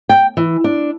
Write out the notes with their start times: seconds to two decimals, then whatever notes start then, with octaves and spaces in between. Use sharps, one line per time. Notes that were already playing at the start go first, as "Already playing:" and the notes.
0.09 G5
0.37 E3
0.64 D4